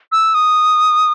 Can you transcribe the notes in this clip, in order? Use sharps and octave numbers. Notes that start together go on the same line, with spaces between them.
E6
D#6